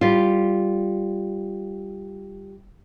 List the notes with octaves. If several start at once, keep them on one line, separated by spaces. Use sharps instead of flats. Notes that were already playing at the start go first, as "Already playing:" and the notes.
G3 F4